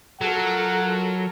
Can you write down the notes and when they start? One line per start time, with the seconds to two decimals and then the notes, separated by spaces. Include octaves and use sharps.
0.21 F#3 F4 A4 A#4 F#5